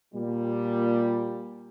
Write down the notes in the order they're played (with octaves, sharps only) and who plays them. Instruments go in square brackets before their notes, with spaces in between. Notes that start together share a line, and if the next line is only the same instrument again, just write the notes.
[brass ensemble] A#2 G3